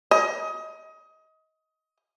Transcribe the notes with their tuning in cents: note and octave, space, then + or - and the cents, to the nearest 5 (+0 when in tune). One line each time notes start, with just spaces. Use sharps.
D#5 +25